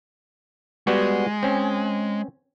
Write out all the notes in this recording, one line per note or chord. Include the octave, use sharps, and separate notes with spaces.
G3 G#3 B3 F#4
C4 C#4